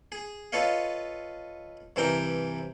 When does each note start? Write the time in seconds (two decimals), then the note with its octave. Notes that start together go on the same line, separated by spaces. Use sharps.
0.12 G#4
0.52 F4 A4 B4 C#5 D#5 F5
1.96 G2 C3 E3 A#4 G5 A#5